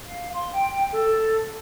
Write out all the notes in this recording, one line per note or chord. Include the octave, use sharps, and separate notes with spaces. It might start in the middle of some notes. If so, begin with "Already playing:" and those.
F5
C6
G5
A4